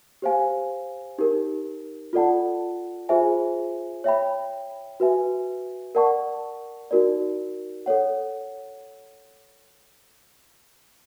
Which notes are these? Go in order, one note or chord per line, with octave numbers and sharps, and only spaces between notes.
G4 C5 F5 G#5
D#4 G4 A#4
F4 A4 D5 F#5 A5
F4 G#4 C5 E5 G#5
C#5 E5 G5 B5
F#4 B4 E5 G#5
A#4 D5 F#5 A5 C#6
D#4 F#4 A#4 D5
A4 C#5 F#5